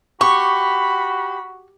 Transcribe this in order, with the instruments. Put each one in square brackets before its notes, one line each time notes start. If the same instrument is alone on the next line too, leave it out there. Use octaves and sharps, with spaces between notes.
[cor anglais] F#4 [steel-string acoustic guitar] G4 [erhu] B5 [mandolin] C#6